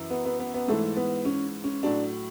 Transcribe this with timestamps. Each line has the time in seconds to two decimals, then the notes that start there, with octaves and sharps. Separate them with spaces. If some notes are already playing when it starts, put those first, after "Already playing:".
Already playing: F#2 E3
0.10 B3
0.25 B3
0.40 B3
0.54 B3
0.68 G#2 E3 A3
0.96 B3
1.25 C#4
1.64 C#4
1.83 A2 F#3 D4